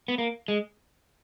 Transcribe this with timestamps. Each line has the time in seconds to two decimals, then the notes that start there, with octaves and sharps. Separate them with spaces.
0.08 B3
0.18 A#3
0.48 G#3